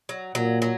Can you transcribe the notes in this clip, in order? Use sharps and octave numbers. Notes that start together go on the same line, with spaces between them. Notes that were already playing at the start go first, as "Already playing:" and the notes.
F#3
A#2 F#3
F#3